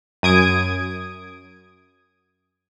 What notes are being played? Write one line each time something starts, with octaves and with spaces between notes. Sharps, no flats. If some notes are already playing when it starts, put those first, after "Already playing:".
F#2 D#6 G#6 D7